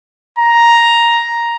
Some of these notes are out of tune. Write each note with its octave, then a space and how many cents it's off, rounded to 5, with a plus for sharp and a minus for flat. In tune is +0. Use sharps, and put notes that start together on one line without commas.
A#5 +5